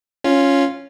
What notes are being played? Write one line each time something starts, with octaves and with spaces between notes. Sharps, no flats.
C#4 F4